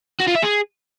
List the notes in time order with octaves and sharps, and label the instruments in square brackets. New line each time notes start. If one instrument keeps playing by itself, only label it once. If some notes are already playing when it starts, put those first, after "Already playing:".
[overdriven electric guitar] F#4
F4
E5
G#4